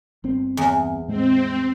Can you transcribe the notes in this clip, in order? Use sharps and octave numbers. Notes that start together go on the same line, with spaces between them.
G1 C4
E2
A2 G#3 C4